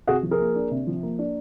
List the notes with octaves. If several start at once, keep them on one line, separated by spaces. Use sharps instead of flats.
C3 F#4 G#4
F3
G#4 A#4
A#3
D4
C3
F3
A#3
D4